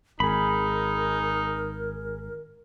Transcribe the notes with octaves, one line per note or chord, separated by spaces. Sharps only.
G#1 D#4 G#4 A#4 B5